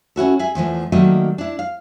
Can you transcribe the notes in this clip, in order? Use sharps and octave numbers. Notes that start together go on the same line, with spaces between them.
C#4 E4 F#4 A4
G#4 E5 G#5
E2 E3 F3 A3
D#3 F#3 G3 A3 A#3 D#5
D4 E4
F5